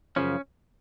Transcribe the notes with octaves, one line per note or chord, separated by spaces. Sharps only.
F#2 C#3 F3 C#4